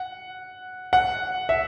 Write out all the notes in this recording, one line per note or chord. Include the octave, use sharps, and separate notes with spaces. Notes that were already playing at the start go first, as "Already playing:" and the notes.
Already playing: F#5
F#5
E5